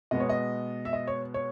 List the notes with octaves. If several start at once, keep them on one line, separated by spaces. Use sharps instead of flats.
B2 G#3 B3 D#5
C#5
D#5
E5
D#5
C#5
C#5